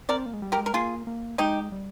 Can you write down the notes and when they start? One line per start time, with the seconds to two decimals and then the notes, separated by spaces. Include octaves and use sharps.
0.09 C4 A#4 D5
0.26 A#3
0.33 G#3
0.42 G3
0.52 G4 A#4
0.57 G#3
0.66 A#4
0.74 A#3 F4 G#4
1.07 A#3
1.38 G#3 D#4 G4
1.72 G3